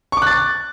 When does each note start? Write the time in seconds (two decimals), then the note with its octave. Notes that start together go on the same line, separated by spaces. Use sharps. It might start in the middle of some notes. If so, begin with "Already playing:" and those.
0.12 C#6
0.17 D6
0.22 F#6
0.27 A6